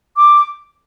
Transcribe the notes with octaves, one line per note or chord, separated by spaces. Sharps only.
D6